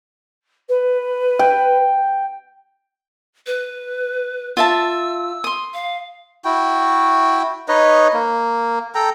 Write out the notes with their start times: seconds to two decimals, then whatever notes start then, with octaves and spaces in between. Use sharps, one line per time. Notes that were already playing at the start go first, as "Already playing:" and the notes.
0.68 B4
1.39 G5
3.47 B4
4.57 F4 E5 A5 E6
5.44 C6 D#6
5.74 F5
6.45 E4 F#4 G5
7.68 D#4 B4 C#5 D#5
8.13 A#3
8.95 A4 G5 A#5